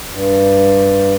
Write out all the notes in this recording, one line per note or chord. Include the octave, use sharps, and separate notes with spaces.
G2